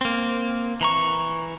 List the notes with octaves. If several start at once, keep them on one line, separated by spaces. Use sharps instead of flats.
A#3 C4
E3 A#5 C#6